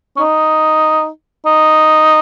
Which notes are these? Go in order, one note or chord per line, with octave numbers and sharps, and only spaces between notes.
C#4
D#4
D#4